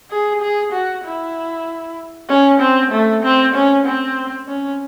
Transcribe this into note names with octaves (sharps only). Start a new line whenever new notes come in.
G#4
G#4
F#4
E4
C#4
C4
A3
C4
C#4
C4
C#4